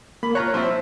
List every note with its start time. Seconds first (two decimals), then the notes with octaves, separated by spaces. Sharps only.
0.23 A#3 B5
0.35 F4 C#5 A#5 F#6
0.54 F3 C4 E4 C5